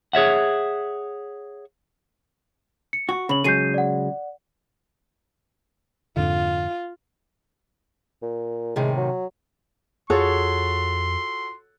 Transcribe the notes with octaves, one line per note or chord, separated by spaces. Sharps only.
G#4 C#5 E5 F#5
C#7
F#4
C#3 B5 F#7
C#3 F#3 G#3 G6 C7 D#7
D5 F#5
F2 G#2 D3 F4
A#2
A2 C3 D#3 G#3
F#3
F2 F4 F#4 G#4 A4 C#5 C6